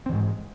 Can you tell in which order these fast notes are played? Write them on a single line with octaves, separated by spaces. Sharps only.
C4 E3 G#2 G#3